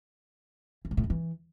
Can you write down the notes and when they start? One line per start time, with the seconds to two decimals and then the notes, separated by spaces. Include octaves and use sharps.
0.85 E3
0.91 G#2
0.97 A2
1.04 F2
1.10 E3